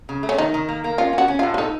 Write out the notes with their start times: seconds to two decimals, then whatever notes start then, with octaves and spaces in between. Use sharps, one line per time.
0.09 C#3
0.23 A3
0.29 C#4
0.38 D#3 D#4
0.54 D#3
0.68 A#3
0.84 A#3
0.98 C#4 F4
1.13 C#4
1.18 F#4
1.28 C#4
1.39 A2 F4
1.54 C#4
1.58 D#4 A4